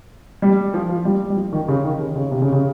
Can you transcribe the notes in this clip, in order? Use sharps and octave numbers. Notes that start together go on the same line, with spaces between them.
G3
F3
F3
G3
G3
F3
D#3
C#3
D#3
C#3
C#3
C3
C#3
C#3